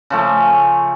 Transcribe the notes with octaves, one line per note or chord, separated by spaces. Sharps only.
C#3 F3 A3